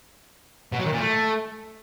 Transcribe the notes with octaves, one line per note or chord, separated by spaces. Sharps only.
B2
F#3
D#3
A#2
A3